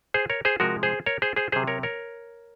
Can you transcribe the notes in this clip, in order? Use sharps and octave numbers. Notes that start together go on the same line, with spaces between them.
G#4 C5
A#4 C#5
G#4 C5
C3 F3 G#3 F#4 A#4
G#4 C5
A#4 C#5
G#4 C5
G#4 C5
C3 F#3 G#4 C5
A#4 C#5
A#4 C#5